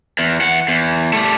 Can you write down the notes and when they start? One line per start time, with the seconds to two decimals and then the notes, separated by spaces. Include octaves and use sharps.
0.19 E2
0.41 E3 F#5
0.68 E2
1.13 G3 A3